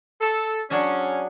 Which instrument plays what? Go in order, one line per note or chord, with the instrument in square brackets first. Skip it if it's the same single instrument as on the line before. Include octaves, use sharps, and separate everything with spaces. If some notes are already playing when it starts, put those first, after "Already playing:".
[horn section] A4
[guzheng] F#3 D4 G#4 [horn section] C#4